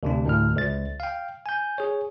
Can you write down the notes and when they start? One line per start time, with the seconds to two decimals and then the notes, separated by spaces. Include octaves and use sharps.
0.03 D2 C3 D4
0.26 D2 A2 F6
0.56 C#2 A6
1.00 F5 G5
1.46 G#5 G6
1.78 G#4 C#5